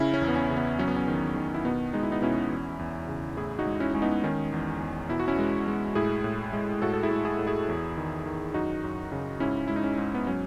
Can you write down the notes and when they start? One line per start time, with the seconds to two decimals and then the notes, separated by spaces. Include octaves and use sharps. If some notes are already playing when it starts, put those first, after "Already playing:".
Already playing: C#3 C#4 E4
0.14 C#4
0.22 E2
0.28 B3
0.36 C#4
0.50 C#3
0.57 B3
0.79 F#3 C#4
0.88 B3
0.97 C#4
1.08 D#3
1.36 D#3
1.54 E4
1.65 B2 B3 D#4
1.93 G#3 D#4
2.03 E4
2.12 B3 D#4
2.22 B2 C#4 E4
2.51 E2
2.79 E2
3.08 C#3
3.37 A2 E4 G#4
3.59 D#4 F#4
3.67 G#3
3.80 C#4 E4
3.94 G#3 C#4
4.02 B3 D#4
4.24 D#3 C#4
4.53 E2
4.80 E2
5.09 B2 E4
5.20 F#4
5.28 C#4 E4
5.38 G#3
5.68 G#3
5.95 A2 E4 G#4
6.24 A2
6.53 G#3
6.82 A2 F#4 A4
6.94 A4
7.03 E4 G#4
7.11 A2
7.25 E4 G#4
7.39 A2
7.47 E4 G#4
7.68 E2
7.98 D#3
8.26 D#3
8.54 F#2 D#4 F#4
8.84 F#2
9.12 C#3
9.40 G#2 C#4 E4
9.68 G#3 E4
9.76 D#4
9.84 C#4
9.98 G#2
10.14 B3
10.27 F#3 C#4